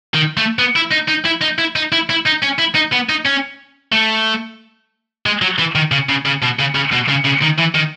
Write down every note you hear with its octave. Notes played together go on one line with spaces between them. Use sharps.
D#3
A3
B3
E4
D#4
D#4
E4
D#4
E4
D#4
E4
E4
D#4
C#4
E4
D#4
B3
D#4
C#4
A3
G#3
F#3
E3
D#3
C#3
C#3
C#3
B2
C#3
C#3
B2
C#3
C#3
D#3
E3
D#3